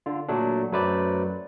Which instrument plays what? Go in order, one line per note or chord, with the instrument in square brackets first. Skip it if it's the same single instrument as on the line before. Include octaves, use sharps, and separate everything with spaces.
[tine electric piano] D3 F4
A#2 F#3 A3 D4
F#2 F#3 A3 B4 C5 D5